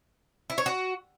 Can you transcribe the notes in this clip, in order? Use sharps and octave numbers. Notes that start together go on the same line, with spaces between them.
E4
C#5
F#4